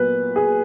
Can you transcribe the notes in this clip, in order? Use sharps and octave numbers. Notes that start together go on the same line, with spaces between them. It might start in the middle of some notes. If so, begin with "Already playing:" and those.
Already playing: A#2 F#3 B3 B4
G#4